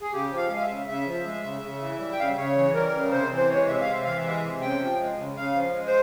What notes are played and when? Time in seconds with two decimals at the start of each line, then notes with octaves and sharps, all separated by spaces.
0.01 G#4
0.12 C#3 G4
0.31 F3
0.37 F5
0.50 G#3
0.56 F5
0.62 E5
0.69 C#3
0.87 C#3 E5
1.07 F3
1.25 G#3
1.44 C#3
1.62 C#3
1.81 E3
1.99 G3
2.12 G5
2.19 C#3 F5
2.28 E5
2.37 C#3 C#5
2.56 E3
2.74 G3 A#4
2.93 C#3
3.11 C3 C5
3.31 E3
3.37 C5
3.50 G#3 C#5
3.67 C3 E5
3.81 F5
3.87 C3 E5
4.05 E3 F5
4.16 E5
4.24 G#3
4.43 C3
4.61 C#3 G5
4.81 F3
4.99 G#3
5.18 C#3
5.37 C#3 F5
5.55 F3
5.73 G#3
5.87 C5